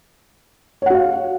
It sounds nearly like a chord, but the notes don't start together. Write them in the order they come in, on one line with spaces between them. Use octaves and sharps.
C#5 F#5 F#4 F5